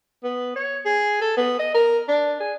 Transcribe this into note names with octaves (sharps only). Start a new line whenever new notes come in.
B3
C#5
G#4
A4
B3
D#5
A#4
D4
G#4